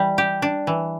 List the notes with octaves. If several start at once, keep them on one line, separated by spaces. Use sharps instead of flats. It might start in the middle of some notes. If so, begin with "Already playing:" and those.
Already playing: E3 G3
G4
D4
E3